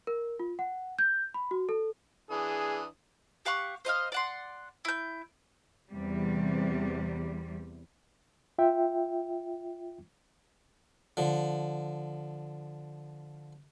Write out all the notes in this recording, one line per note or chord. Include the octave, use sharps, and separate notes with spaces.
A#4
F4
F#5
G6
B5
F#4
A4
E3 D4 G#4 D#6
G4 F5 F#5 C#6
C5 D#5 F5 F6
D5 F#5 C6
E4 G6
E2 C3 G3
F4 E5 G5
D3 F3